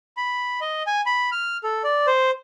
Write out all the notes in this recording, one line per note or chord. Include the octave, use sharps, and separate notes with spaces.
B5
D#5
G#5
B5
F6
A4
D5
C5